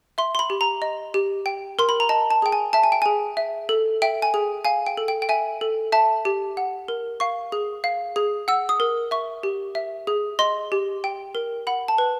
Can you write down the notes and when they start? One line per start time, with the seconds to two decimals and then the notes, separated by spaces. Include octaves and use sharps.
0.18 E5 C6
0.35 C6
0.39 B5
0.50 G4
0.61 A#5
0.82 D#5
1.14 G4
1.46 G5
1.79 A#4 C6
1.89 B5
2.00 A#5
2.09 D#5 A5
2.31 A5
2.42 G#4 G5
2.52 G#5
2.73 E5 A5
2.83 G#5
2.92 G5
3.02 G#4 G#5
3.37 E5
3.69 A4
4.02 E5 G5
4.22 G#5
4.34 G#4
4.65 F5 G#5
4.86 G5
4.97 A4
5.08 G5
5.22 G5
5.29 E5 G#5
5.61 A4
5.92 E5 A5
6.25 G4
6.57 F#5
6.88 A#4
7.20 F5 C#6
7.52 G#4
7.84 F5
8.16 G#4
8.48 F#5 E6
8.69 D#6
8.80 A#4
9.11 E5 C#6
9.43 G4
9.75 E5
10.07 G#4
10.39 D#5 C6
10.72 G4
11.04 G5
11.35 A#4
11.67 F#5 B5
11.88 A5
11.98 B4